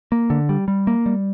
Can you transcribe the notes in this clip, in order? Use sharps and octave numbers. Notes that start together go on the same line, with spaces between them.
A#3
D3
G3
G3
A#3
G3